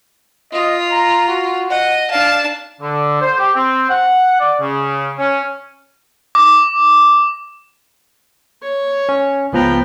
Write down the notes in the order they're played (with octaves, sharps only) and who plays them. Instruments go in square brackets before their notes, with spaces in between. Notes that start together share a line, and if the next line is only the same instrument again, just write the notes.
[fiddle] F4 [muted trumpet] D#5
[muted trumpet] A#5
F#4
[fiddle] D#5 [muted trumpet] F#5
[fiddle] D4 A5 [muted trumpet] F5
[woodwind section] D3
C5
G4
C4
F#5
D5
C#3
C#4
[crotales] D6
[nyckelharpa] C#5
[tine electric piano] C#4
[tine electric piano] C#2 F3 A#5 [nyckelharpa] B3 G5